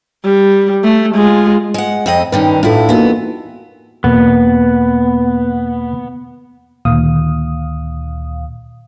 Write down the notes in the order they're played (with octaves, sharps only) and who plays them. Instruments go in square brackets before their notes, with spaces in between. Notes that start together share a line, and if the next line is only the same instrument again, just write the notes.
[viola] G3
A3
G#3 F4
[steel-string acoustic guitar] G#3 F#5
F2 C4 D#5
[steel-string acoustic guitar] G2 D#3 C#4 [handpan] B4
[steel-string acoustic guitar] A2 E4 [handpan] D4 F4 A4
[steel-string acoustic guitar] E3 B3 [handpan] A#3 D#4 F#4
[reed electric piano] E2 B2 A#3 [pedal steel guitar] B3
[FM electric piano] D2 A#2 D#3 F5 D#6